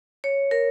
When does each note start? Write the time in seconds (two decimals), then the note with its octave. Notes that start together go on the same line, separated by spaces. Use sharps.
0.24 C#5
0.51 A#4